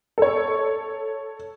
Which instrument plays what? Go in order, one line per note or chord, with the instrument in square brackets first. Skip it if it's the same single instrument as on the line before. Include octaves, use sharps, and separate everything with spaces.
[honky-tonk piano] A4 C#5